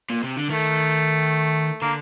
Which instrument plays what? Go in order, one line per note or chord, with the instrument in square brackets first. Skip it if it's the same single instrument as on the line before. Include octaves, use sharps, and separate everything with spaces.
[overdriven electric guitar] A#2
C3
D3
[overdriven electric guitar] D#3 [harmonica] A3
[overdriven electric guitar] D3 [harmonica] A#3